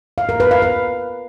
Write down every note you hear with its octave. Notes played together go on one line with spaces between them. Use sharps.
F5
A#4
B4
F5
B4